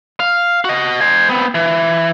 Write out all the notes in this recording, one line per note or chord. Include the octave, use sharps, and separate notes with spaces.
F5
F#4 D#5
C5 G#5
B3 C4
E3